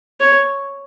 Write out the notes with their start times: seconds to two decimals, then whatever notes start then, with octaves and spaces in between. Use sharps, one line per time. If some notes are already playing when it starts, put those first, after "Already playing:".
0.20 C#5